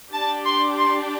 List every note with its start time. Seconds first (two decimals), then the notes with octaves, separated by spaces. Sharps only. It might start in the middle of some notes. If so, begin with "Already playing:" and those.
0.13 D4 G4 A5
0.45 C6
0.78 C6